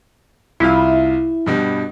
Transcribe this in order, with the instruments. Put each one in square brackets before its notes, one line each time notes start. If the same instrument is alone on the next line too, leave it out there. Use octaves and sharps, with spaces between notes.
[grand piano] C2 F4 F5 [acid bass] E4
[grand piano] G2 B2 G3